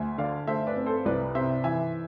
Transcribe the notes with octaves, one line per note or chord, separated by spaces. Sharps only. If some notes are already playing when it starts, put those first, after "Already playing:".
Already playing: D2 E5 G#5
D3 D5 F5
A3 C5 E5
B4 D5
C4
A4 C5
C2 B4 D5
C3 C5 E5
E3 E5 G#5